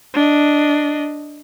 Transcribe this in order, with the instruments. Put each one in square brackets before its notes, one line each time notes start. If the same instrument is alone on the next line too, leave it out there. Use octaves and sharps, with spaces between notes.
[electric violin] D4 D#5